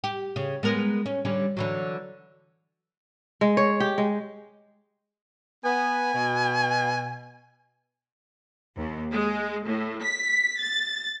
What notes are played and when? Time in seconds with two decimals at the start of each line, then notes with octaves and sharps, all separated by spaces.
0.04 G4
0.36 C#3
0.63 G#3 B3 A#4
1.06 C#4
1.25 D3 G3 C#4
1.57 D3 E3 F#3
3.41 G#3
3.57 C#5
3.80 G4
3.98 G#3
5.64 B3 G#5
6.14 B2
8.77 D#2
9.13 G#3
9.67 A2
10.03 B6
10.60 A6